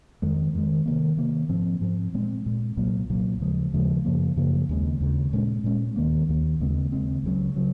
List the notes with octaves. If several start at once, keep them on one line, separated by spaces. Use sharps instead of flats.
F2 D#3 G#3
F2 D#3 G#3
C3 D#3 A#3
C3 D#3 A#3
G#2 F3 C4
G#2 F3 C4
A#2 G#3 C4
A#2 G#3 C4
C2 A#2 F#3 A#3
C2 A#2 F#3 A#3
D#2 C#3 F3 G#3
D#2 C#3 F3 G#3
F#2 C#3 F3 A#3
F#2 C#3 F3 A#3
D#2 C#3 G#3
D#2 C#3 G#3
A#2 G#3 C#4
A#2 G#3 C#4
D#2 D#3 A#3
D#2 D#3 A#3
D#2 C#3 G#3 C4
D#2 C#3 G#3 C4
C#2 C#3 F#3
C#3 F#3